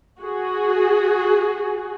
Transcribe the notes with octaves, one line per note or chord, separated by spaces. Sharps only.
F#4 G#4